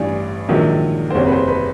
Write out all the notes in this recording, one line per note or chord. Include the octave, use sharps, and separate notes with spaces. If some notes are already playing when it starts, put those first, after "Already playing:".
Already playing: A1 G2 E3 D5
A#1 G#2 D#3 F#3
C5
F#1 E2 C3 C#5
B4
C5
B4